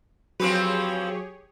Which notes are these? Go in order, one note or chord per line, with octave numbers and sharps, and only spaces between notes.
F3 F#3 C4 G4 G#4 B4 C#5